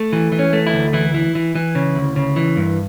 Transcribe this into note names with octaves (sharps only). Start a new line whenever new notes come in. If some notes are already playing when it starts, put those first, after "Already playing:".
Already playing: A3
E3
E3
C#4
A3
E4
D2
E3 E4
E3
E3
E3
C#3
D2
C#3
E3
G2